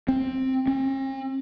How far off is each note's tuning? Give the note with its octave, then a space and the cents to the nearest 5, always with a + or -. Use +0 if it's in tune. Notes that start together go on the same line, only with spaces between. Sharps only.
C4 +10
C4 +45